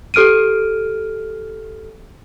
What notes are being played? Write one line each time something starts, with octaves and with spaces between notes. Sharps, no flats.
G4 A4 F6 D7 D#7